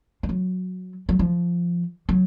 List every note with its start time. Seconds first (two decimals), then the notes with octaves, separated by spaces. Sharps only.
0.23 F3
0.29 F#3
1.09 F#3
1.19 F3
2.09 F#3